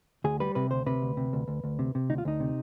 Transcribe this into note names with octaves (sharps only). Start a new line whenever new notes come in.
D2 G#4
G3 B4
C3 B4
D2 C5
C3 B4
D2
C3
D2
D2
D2
C3
C3
D2 D#4
F4
D2 D#4
C3